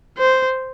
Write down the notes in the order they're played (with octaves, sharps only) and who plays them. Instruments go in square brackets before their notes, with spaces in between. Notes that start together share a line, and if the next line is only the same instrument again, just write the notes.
[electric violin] C5